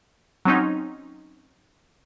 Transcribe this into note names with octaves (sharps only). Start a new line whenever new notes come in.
F#3 C4 C#4 D#4